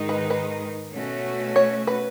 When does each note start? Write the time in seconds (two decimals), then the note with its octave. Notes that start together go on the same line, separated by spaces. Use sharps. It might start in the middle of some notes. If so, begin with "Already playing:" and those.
Already playing: G#2 D#3 G#3 D#4
0.09 B4
0.30 B4
0.93 B2 A3 C#4 F#4
1.56 C#5
1.87 B4